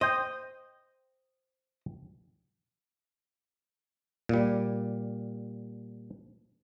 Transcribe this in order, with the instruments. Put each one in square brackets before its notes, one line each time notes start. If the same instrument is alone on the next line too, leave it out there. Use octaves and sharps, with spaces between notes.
[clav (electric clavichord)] C5 G5 [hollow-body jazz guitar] D#5
[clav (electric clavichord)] A#2 G3